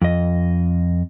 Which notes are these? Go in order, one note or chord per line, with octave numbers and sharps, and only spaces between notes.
F2 D#5